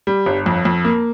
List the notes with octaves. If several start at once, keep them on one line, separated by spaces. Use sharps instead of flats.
G3
G1
F2
F2
A#3